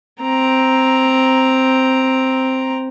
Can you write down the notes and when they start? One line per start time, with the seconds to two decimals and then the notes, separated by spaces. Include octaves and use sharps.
0.22 C4 A#5